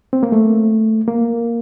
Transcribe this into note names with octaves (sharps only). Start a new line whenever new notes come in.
C4
A#3
A3
A#3